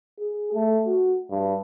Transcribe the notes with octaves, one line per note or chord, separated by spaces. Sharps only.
G#4
A3
F#4
G2